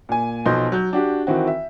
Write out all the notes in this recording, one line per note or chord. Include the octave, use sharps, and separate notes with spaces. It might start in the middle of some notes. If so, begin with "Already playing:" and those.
A#2 G#5
B1 B2 F3 D#5 C6 G6
F#3 G6
D4 F#4 G4
D#3 E3 C4 F#4
E5